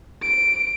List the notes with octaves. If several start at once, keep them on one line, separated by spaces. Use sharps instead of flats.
D7